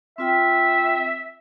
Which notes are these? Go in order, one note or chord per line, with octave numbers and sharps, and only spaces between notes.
C4 F4 E5 G5